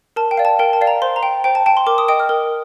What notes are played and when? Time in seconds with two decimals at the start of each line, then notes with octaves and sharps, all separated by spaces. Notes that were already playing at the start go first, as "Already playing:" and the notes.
0.16 A#4 A5
0.31 G5
0.37 D5 F5
0.45 A5
0.59 A#4 G5
0.73 A5
0.81 D5 F5
0.87 A#5
1.02 C5 C6
1.16 A#5
1.23 G5
1.44 C5 G5
1.55 A5
1.66 G5 A5
1.77 C6
1.87 A#4 D6
1.98 D#6
2.08 D#5 G5 D#6
2.20 F6
2.29 A#4